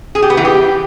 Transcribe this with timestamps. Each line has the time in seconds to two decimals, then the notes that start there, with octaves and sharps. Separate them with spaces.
0.15 G#4
0.22 G4
0.30 B3
0.37 E3
0.45 G4